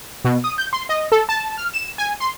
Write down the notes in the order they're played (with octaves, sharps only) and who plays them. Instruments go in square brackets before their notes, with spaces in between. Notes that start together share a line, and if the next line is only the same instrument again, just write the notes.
[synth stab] B2
D#6
G6
C6
D#5
A4
A5
F6
E7
G#5
C6